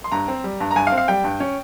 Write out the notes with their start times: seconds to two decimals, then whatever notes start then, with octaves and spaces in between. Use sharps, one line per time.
0.04 C6
0.12 G2 A#5
0.28 C4
0.44 G3
0.60 G2
0.71 A#5
0.76 G2 G#5
0.87 F5
0.92 C4
0.98 F5
1.08 G3 G5
1.24 G2
1.40 C#4